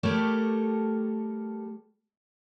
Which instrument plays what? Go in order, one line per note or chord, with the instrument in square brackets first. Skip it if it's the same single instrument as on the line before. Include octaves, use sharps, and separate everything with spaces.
[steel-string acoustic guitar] G3 A3 G4 A4 A#4 C#5